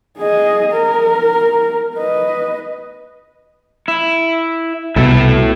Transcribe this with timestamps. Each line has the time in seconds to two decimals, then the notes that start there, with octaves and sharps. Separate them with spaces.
0.18 G#4 D#5
0.72 A#4
1.96 B4 D#5
3.88 E4
4.96 C2 B2 E4 A4 E5